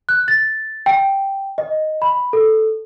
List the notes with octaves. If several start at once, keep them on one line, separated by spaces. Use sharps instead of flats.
F#6
A6
G5
D#5
B5
A4